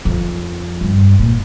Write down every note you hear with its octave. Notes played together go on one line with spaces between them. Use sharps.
F2
G2
A#2